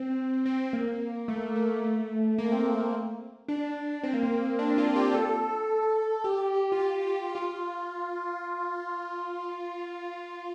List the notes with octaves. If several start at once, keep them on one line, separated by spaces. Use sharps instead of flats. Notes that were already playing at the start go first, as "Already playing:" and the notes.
Already playing: C4
C4
A#3
A3
A#3
A3
A#3
C4
A#3
D4
C4
A#3
C4
D4
F4
G4
A4
G4
F4
G4
F4
G4
G4
F4